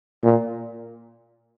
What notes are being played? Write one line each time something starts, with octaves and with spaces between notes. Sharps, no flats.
A#2